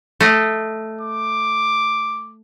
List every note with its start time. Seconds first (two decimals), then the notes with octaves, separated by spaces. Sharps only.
0.21 A3 D#5
1.01 D6